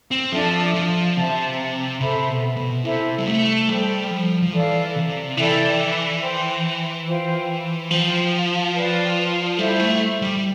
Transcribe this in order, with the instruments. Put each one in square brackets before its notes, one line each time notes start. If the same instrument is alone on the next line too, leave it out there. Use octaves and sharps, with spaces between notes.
[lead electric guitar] C4
[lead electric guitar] F3 [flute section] D4 A4 E5 A5
[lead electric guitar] F3
[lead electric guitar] C3 [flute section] C5 E5 A5
[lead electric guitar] C3 [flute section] A4 C5 E5 B5
[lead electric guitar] B2
B2
[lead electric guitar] C3 [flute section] E4 A4 C5 E5
[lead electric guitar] G3
A3
[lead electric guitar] G3 [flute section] A4 C5 G5
[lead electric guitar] F3
F3
[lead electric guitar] E3 [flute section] A4 D5 F5
[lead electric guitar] C3
[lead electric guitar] E3 [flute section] E4 A4 D5 G5
[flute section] C5 G5 C6
F4 C5 G5
[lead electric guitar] F3 [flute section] C5 G5 C6
[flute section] B4 D5 G5
[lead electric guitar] G3 [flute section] E4 A4 C5 E5
[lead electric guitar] A3
G3